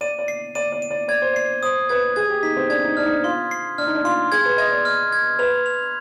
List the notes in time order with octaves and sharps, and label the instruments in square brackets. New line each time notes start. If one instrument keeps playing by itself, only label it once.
[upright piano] D5 [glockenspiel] D#7
[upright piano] D5
[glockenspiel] C7
[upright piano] D5 [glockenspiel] D#7
[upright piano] D5
[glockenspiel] D#7
[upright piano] D5
[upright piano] D5 [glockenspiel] G#6
[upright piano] C5
[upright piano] D5 [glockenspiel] C7
[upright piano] C5 [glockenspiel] D#6
[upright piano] B4 [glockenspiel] G#6
[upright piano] G#4 [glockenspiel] G#6
[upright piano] G4
[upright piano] D#4 [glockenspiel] B6
[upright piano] C4
[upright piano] D4 [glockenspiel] G#6
[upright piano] D#4
[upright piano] D4 [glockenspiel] F6
[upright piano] D#4
D4
[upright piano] F4 [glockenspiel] C6
[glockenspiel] C7
[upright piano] D4 [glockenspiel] F6
[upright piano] D#4
D4
[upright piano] F4 [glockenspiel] C6
[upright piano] G#4 [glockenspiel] G#6
[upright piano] B4
[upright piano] D#5 [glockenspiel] G#6
[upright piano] D5
[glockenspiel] F6
G#6
[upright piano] B4 [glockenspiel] F7
[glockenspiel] F7